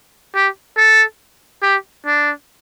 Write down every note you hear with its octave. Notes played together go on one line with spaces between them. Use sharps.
G4
A4
G4
D4